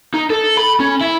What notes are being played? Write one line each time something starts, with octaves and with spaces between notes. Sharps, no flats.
D#4
A4
B5
C#4
E4